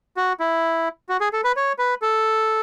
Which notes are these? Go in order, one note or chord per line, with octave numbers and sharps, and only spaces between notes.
F#4
E4
F#4
G#4
A4
B4
C#5
B4
A4